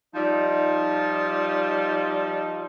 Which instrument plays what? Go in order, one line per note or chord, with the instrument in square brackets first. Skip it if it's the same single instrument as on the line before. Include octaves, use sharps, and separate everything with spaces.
[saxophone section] F3 G3 D#4